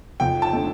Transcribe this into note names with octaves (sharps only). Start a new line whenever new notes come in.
F2 G5
A5
D3 A3